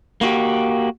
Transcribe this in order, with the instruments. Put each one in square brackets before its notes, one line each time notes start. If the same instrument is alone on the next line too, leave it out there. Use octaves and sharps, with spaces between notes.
[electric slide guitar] A#3 F#4 G4